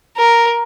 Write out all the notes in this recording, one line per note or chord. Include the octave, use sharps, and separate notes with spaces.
A#4